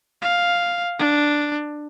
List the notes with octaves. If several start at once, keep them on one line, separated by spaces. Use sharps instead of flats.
F5
D4